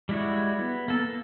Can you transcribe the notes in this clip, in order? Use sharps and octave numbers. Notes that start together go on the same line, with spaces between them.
G3 G#3 E4 F#4 C#5
B3
A#3 A4
A#3